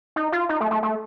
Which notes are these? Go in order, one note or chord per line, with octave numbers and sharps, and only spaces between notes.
D#4
F4
D#4
A3
A3
A3